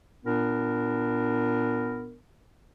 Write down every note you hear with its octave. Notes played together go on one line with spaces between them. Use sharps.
A#2 B3 D4 A#4